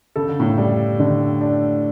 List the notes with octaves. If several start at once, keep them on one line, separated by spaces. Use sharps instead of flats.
C#3 A4
D3
A2 C#3
G3
D3
D4